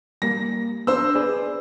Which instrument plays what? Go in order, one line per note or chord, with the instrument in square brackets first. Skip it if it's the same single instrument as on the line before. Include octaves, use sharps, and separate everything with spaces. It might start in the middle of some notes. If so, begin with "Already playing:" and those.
[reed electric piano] G3 A#3 [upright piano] A#6
[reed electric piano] B3 D4 [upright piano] C5 E6
[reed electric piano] G#4 B4 D5